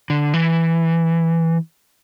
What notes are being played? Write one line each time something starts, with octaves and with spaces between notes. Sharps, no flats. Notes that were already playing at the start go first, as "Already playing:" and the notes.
D3
E3